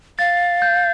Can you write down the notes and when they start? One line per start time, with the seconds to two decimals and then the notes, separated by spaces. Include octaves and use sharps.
0.19 F5 A6
0.62 G6